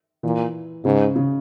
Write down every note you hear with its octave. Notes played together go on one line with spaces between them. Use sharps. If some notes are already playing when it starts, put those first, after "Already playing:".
A#2 E3
G#2 C#3
C#3